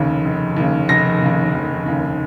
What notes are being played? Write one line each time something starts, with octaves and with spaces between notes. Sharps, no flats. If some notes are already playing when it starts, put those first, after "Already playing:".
Already playing: F1 D#2 C#3
F1
D#2 C#3
F1 A#6
D#2 C#3
F1
D#2 C#3